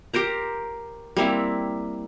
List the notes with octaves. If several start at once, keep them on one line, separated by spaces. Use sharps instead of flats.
G4 A#4 C5 A#5
G3 A#3 C4 E4